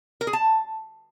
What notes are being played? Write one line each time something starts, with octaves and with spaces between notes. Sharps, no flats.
A#4
G#4
A5